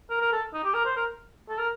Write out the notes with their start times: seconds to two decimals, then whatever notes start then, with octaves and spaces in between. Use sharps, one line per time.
0.10 A#4
0.21 A#4
0.32 A4
0.53 D#4
0.64 G4
0.74 A#4
0.85 C5
0.96 A#4
1.49 A4
1.58 A#4